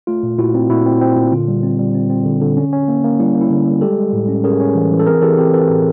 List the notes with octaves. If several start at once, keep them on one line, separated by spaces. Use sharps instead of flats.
A3 F4
A#2
A#2 E4 F#4
C4
A#2 E4 F#4
C4
C4
A#2
D3 F4
G3
C4
G3
C4
C4
D3
D3
C#4
C#4
A#3
A#3
G3 E4
A#3
E4
D3
G3
G#3 G4 A4
G#3
A2
C#4
C#4 G#4 A#4
C#4
E3
E3
A4
C4 G#4 A#4
E3 G4 A4
C4 G4 A4
C4 A4 B4
A2